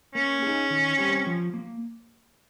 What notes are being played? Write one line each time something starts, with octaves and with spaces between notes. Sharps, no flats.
A#3 C#4
D#4 G#4
D#3
G3 C4 G4
F3
A#3